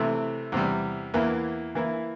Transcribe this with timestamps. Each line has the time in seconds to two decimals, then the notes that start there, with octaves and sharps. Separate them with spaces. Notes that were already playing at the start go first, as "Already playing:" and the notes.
Already playing: C3 E3 A3 C4
0.52 E2 C3 G3
1.14 E2 E3 A#3 E4
1.75 E3 A#3 E4